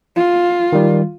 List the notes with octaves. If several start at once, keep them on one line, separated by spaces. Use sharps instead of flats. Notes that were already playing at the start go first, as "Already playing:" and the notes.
F4
D#3 G3